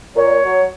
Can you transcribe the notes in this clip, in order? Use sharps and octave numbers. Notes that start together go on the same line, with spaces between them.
A#2 C#5
F#3